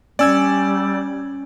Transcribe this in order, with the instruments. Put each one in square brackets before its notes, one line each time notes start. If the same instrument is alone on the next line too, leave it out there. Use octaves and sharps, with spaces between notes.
[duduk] G3 [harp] C#4 [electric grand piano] D5 E6 G#6